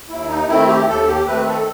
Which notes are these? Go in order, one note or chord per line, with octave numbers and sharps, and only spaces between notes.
D#2 E4
D#4
D#3 A3 C4 E4
G4
D#2 A4
G4
D#3 A3 C4 B4
A4